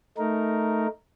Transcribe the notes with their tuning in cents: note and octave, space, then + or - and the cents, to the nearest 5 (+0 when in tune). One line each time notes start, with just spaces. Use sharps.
A3 +0 D#4 +0 A#4 +0